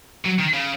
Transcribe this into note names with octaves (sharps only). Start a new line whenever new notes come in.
F#3
D#3
C#3